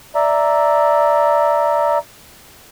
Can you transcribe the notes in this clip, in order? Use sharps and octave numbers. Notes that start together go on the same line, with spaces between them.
D5 E5 A#5